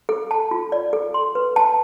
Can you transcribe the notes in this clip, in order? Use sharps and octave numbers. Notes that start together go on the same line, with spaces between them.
A4
A5
F4
D5
A4
C6
B4
A5